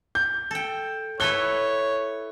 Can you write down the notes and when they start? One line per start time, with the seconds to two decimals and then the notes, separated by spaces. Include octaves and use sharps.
0.15 G6
0.51 A4 G5
1.20 E4 A4 B4 C#5 F#6 G7